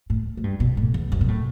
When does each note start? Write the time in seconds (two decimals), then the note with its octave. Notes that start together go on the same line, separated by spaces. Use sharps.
0.10 A2
0.37 A2
0.44 G2
0.60 B2
0.77 A2
0.94 E2
1.12 F#2
1.21 B2
1.28 A2